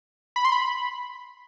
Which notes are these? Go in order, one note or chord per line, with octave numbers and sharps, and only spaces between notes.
B5
C6
B5